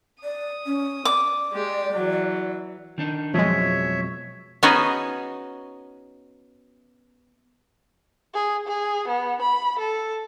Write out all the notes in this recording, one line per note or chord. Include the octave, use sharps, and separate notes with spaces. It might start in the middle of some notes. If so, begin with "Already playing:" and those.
D5 D#6
C#4
D5 D6
G#3 G4
E3 F#3
D#3 D4 D#4
F2 B2 F3 F#3 G#3 C#5 E5
B3 C#4 D#4 F#4 G#4
G#4
G#4
B3
B5
A4